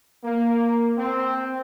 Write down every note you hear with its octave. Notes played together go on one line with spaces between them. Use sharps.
A#3
C4